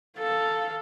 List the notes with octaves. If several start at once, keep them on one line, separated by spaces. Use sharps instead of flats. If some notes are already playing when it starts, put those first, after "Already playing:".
A4 F5